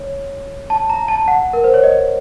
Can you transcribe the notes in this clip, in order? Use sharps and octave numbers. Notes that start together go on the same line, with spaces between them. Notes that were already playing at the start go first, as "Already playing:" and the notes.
Already playing: C#5
A5
A#5
A5
F#5
A#4
C5
C#5
D#5